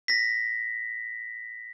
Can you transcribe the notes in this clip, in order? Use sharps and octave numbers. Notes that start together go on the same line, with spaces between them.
A#6 B6